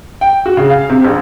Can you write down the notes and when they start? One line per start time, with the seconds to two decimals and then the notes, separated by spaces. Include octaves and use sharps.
0.21 G5
0.46 F#4
0.57 C#3
0.70 F5
0.90 C3
1.05 A#1